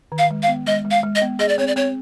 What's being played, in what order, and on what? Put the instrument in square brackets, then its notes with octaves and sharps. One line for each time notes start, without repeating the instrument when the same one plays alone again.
[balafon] D#3
[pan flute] F5
[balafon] G#3
[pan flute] F5
[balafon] B3
[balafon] G#3 [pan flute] D#5
[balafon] G#3
[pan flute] F5
[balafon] G#3
[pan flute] D#5
[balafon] B3
[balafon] G#4 [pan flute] D#5
[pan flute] D5
[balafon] C4 [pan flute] C#5
[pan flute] D5
[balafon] C4 [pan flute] C#5